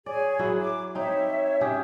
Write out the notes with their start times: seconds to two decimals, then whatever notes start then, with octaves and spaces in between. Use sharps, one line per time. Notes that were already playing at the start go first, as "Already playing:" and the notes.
0.06 G#4 C#5 D5 G#5
0.39 F#3 E4 F#4
0.59 D6
0.95 C4 D#4 C#5 E5
1.61 C#3 G4 G#4